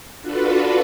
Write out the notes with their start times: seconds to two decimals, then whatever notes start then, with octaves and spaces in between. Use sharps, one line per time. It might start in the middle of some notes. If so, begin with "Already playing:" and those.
0.22 D4 F4 F#4 A4 B4